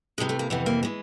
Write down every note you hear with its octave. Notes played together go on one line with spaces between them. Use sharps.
F2 C3 E3 G#3
A3
A#3
F2 C3 E3 B3
A#3
E3 G#3